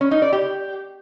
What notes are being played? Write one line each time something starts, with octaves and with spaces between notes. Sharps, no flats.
C#4
D#4
D5
G4